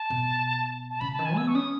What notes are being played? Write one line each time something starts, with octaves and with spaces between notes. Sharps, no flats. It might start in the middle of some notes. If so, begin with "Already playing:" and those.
Already playing: A5
B2
A5
C#3 B5
A5
D#3
G#5
B3 E6
C#6
C#4 D#6